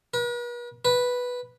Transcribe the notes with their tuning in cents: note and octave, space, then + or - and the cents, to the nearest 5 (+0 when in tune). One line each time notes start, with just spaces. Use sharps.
B4 -45
B4 -5